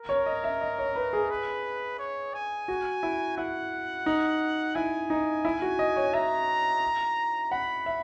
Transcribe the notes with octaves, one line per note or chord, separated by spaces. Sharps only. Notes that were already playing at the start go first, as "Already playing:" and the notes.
Already playing: A#4
C#5
D#5
E5
D#5
C#5
B4
G#4
B4
C#5
G#5
F#4
E4
E4 F#5
D#4
E4 G#5
D#4
E4
F#4
D#5
C#5
E5 A#5
F#5 B5
E5